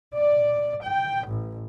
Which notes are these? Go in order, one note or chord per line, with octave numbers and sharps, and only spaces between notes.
D5
G5
A1